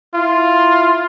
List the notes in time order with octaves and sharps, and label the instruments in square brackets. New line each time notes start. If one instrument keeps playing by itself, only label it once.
[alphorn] E4 [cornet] F4